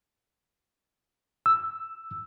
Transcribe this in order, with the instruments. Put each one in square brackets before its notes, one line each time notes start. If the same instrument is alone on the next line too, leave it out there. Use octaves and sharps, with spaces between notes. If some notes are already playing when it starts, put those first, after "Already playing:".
[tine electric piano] E6